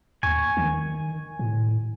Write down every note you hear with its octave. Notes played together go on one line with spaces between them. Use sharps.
D#2 G#5 C#6
D#3
A2